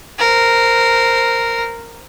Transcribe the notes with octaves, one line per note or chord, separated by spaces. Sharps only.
A#4 C5